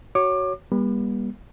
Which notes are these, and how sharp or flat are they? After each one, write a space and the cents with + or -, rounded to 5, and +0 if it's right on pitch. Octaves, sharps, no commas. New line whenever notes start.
F#4 +15 C#5 +0 D6 +30
G3 +30 B3 -40